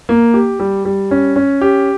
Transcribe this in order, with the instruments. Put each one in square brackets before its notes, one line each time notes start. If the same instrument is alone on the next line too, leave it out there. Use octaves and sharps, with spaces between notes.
[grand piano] A#3
G4
G3
G3
C#4
C#4
G4